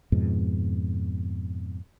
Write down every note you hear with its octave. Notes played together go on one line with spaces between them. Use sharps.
F2 G#2 B2